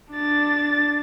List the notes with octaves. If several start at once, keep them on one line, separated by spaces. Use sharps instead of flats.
D4 A6